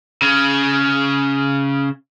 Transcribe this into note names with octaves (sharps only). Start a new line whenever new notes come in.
C#3 C#4